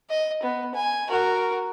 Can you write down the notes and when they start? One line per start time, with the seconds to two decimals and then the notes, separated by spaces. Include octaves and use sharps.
0.10 D#5
0.43 B3
0.75 G#5
1.09 F#4 A#4